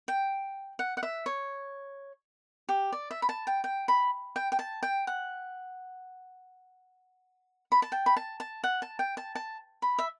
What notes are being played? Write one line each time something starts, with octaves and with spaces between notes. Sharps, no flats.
G5
F#5
F#5
E5
C#5
G4
D5
E5
B5
A5
G5
G5
B5
G5
G5
A5
G5
F#5
B5
A5
G5
B5
A5
A5
F#5
A5
G5
A5
A5
B5
E5